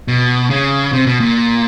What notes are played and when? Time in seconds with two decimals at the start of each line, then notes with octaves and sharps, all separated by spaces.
0.08 B2
0.50 C#3
0.93 C3
1.07 B2
1.20 A#2